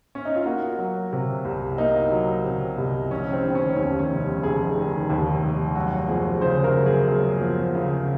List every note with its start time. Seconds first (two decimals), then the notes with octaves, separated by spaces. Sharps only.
0.15 C#4
0.25 D#4
0.36 F4
0.46 A#3 F#4
0.78 F#3
1.13 C3
1.45 C2
1.78 A#3 D#4
2.12 F#3
2.45 C3
2.78 C2
3.11 F1 C#4
3.33 C4
3.43 D#3
3.51 C4
3.55 C#4
3.77 D#2 C#4
3.99 C#4
4.11 F1
4.42 F1 G#4
4.76 D#3
5.10 D#2
5.42 F1
5.76 F#2 F#4
6.08 F3 G#4
6.41 C#3 C5
6.64 A#4
6.75 F#2
6.86 G#4
7.08 F#2
7.41 F3
7.75 C#3